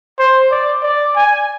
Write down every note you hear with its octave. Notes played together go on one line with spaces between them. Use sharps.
C5
D5
D5
G#5